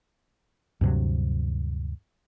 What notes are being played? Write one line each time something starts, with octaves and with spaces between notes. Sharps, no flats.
D2 G2 C3 F#3